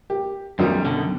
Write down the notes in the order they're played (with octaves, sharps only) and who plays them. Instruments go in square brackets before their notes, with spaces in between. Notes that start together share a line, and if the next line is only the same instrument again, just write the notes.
[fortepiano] G4
[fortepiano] B1 D#3 F#3 [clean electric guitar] F#2 G3
[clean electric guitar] F#2 B2 D3